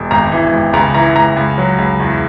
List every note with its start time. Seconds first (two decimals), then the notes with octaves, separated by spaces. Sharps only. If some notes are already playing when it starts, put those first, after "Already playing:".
Already playing: E1
0.11 G#1 A#5
0.32 E3
0.53 G#1
0.73 C#2 A#5
0.94 E3 A#5
1.16 C#2 A#5
1.37 C#2
1.58 F#3
1.78 C#2
2.00 E2